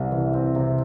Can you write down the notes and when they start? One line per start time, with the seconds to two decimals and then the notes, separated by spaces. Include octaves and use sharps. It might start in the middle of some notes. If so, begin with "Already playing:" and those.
Already playing: C2 C3
0.12 E3
0.34 C4
0.56 C3